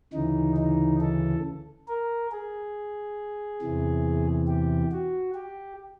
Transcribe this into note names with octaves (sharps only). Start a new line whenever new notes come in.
D2 C#3 E3 D#4
D#4
A4
A#4
G#4
E2 C3 E3
G4
F#4
G4